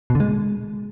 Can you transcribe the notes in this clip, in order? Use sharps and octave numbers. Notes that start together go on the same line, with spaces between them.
B2
D3
G#3